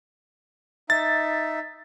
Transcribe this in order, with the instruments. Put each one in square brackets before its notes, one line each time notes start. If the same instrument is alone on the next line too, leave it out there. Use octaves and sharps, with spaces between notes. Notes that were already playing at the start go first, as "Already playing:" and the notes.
[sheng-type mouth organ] D#4 E5 [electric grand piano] A6